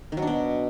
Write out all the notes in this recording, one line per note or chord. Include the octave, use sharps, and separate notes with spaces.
D#3
F#3
D4
B2